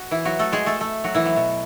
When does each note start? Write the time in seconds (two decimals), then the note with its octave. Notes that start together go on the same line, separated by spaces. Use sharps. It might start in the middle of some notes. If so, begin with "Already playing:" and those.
Already playing: F#4
0.11 E3 E4
0.25 F#3 F#4
0.39 A3 A4
0.52 G#3 G#4
0.66 A3 A4
0.80 A3 A4
1.04 F#3 F#4
1.15 E3 E4
1.26 F#3
1.36 B2